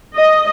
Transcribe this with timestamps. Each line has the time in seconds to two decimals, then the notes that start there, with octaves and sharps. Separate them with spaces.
0.16 D#5